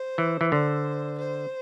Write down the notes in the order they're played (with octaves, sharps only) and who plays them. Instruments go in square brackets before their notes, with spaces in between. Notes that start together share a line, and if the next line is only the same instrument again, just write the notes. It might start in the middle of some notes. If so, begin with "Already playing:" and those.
Already playing: [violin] C5
[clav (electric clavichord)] E3
E3
[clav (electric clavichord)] D3 [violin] C5
[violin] C5